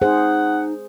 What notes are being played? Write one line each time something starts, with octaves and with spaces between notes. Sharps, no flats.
D#4 G#4 C5 F#5